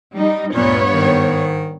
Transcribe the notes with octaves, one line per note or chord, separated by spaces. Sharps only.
G3 D#4
D2 G2 A#2 B3 C#5
G#2 D#3